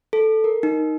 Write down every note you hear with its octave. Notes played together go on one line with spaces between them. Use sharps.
A4
A#4
D#4